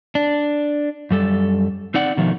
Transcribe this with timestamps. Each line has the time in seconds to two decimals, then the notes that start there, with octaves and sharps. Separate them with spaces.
0.15 D4
1.11 F#2 G3 A4
1.94 C4 D#4 D5 F#5
2.17 B2 D#3 F3 A3